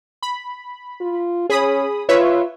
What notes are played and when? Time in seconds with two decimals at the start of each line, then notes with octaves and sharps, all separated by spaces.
0.22 B5
1.00 F4
1.50 C#4 G#4 B5 D#6
2.09 F4 B4 C#5 E5